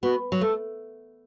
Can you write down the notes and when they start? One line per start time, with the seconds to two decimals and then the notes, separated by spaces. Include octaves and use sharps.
0.02 B3 F#4
0.32 F#3
0.41 A3 A4